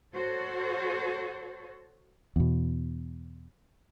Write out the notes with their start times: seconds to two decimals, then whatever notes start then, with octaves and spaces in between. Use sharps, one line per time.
0.14 F#4 A4 C5 C#5
2.36 E2 B2